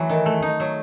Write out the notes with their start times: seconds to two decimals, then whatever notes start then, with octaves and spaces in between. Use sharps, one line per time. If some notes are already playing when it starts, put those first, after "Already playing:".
Already playing: E3 F#3 A3
0.09 D#3
0.26 A3
0.43 D#4
0.60 F#3